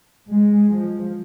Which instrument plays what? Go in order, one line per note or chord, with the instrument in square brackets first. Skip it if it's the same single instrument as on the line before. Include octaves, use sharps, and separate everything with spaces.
[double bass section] G#3
F3